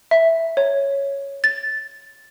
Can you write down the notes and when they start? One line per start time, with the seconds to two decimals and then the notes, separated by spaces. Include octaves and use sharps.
0.11 E5
0.57 C#5
1.44 A6